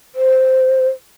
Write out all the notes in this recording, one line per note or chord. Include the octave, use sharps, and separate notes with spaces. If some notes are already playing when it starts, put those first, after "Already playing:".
C5